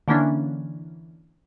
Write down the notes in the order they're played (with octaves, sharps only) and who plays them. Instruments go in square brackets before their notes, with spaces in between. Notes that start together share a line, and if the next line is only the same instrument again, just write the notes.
[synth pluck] D3 E3 A#3 C#4 D4